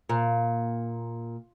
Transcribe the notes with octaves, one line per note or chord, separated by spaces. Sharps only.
A#2